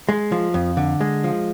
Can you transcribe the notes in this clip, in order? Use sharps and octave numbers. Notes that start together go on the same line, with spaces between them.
G#3
F3
F2
D3
G#3
F3